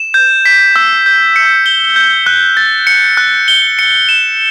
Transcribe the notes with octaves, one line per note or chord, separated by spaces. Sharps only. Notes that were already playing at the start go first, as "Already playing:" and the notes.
Already playing: E7
G6
B6
E6
G6
C#7
G7
G6
F#6
A6
C#7
F#6
G7
C#7
E7